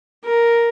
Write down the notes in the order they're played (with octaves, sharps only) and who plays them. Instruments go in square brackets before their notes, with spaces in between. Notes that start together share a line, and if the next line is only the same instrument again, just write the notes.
[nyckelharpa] A#4